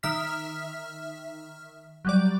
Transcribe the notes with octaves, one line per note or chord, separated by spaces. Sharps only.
D#3 E5 F6 B6
F#3 G3 D5